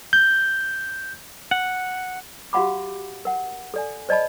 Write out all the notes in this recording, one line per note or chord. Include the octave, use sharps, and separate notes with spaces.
G6
F#5
F#4 G4 F5 F#5 B5 D6
A#4 F#5
A4 D5 G#5
C5 D5 D#5 A5 B5